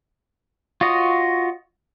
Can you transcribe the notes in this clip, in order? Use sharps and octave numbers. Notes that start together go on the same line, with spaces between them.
F4 F#4 C#5 D#5